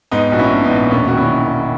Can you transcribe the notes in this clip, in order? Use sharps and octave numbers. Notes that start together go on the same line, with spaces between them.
G#2 B3 D#4
A#1 F#4
C#4 E4
A#1
B3 D#4
A#1
E1 A#3 C#4
D#3 F#4
C#4 E4